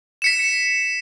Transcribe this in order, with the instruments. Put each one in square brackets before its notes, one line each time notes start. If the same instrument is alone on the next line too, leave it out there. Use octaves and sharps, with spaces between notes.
[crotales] B6 C#7 E7